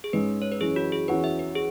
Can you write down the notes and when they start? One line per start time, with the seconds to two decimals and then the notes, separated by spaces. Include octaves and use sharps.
0.04 G#4
0.13 G#2 G#3 C#4 B4
0.42 C#5
0.52 B4
0.61 F#2 E3 C#4 G#4
0.76 F#4
0.92 G#4
1.08 E2 E3 C#4 F#4 B4
1.24 E5
1.39 B4
1.55 G#4